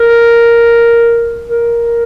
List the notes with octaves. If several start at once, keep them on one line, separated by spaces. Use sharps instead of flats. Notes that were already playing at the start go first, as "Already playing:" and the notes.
Already playing: A#4
A#4